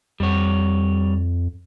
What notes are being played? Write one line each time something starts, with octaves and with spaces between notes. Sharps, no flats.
F2 G3 C#5